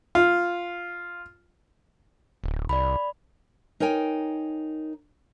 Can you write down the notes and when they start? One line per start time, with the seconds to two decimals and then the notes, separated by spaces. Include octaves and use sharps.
0.15 F4
2.44 D1
2.69 C2 D5 B5
3.80 D#4 A#4 C#5 G5 G#5